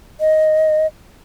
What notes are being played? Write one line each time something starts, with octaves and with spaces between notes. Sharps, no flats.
D#5